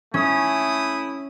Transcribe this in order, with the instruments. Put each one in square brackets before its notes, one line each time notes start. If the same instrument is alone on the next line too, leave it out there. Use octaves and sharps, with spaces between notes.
[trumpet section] A3 E4 D#6 [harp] C#4